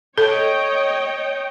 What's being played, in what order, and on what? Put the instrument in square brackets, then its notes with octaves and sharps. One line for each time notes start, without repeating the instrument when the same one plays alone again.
[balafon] A4 [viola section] C#5 D#5 G5